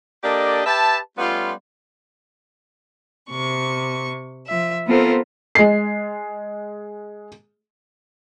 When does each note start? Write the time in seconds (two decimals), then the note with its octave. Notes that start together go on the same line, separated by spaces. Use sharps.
0.23 A#3 D4 G4 A4 D5 D#5
0.66 G4 B4 E5 A5
1.18 G3 A3 B3 C#4 F4
3.29 C3 C#6
4.46 F3 E5
4.87 B3 C4 F4 A4 A#4 C5
5.55 G#3 C7